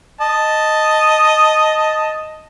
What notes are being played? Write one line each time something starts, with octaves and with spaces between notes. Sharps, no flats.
D#5 A5